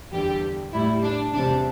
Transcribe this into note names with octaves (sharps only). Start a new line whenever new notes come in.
E2 D3 G3 G4
A2 G3 E4
D4
E2 C3 G3 D4